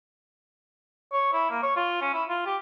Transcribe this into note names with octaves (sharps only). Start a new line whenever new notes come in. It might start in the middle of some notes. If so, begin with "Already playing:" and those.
C#5
E4
A#3
C#5
F4
C#4
E4
F4
G4